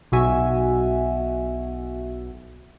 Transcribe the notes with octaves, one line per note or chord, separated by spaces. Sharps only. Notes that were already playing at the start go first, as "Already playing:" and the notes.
B1 B2 F#4 E5 G#5